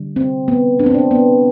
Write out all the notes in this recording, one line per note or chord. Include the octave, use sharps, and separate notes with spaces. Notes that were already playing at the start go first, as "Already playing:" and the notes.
Already playing: D3 G3
C4
B3
D4
C4
D4
B3